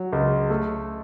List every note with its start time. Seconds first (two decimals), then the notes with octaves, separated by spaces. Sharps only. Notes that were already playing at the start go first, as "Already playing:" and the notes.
Already playing: F#3
0.13 C#2
0.50 A3